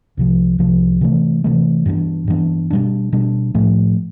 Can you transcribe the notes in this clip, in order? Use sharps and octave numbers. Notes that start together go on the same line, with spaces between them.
C2 C3 F3
C2 C3 F3
C3 E3 A3
C3 E3 A3
G2 E3 B3 D4
G2 E3 B3 D4
B2 G3 D4
B2 G3 D4
A2 F3 A3